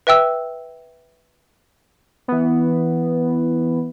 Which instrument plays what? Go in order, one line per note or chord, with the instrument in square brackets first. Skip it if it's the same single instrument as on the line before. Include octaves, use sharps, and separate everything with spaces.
[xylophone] B4 E5 G5 E6
[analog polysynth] E3 B3